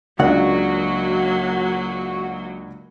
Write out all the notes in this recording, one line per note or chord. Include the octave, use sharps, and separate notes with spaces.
C#2 C#3 F#3 A#3 D4 F#4 A#4 F#5